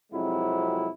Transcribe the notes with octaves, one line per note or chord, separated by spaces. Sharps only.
F2 C3 F#3 G#3 E4